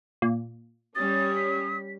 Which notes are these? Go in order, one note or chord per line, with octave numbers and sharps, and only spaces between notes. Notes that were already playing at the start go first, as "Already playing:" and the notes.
A#2
G3 C#4 D#6 A6
B6